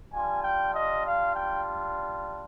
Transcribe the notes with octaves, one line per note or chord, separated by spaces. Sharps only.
G3 D4 F4 G#5
G5
D#5
F5
G5